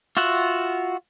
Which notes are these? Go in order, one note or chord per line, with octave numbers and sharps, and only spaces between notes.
F4 F#4 E5 F#5